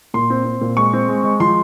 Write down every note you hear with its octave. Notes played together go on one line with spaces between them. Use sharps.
A#2 C6
C4
C4
A#2
G#3 C#6
C4
G#3
G#3
F3 C6